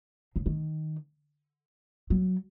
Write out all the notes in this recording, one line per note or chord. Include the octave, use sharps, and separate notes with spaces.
C#3
D#3
F#3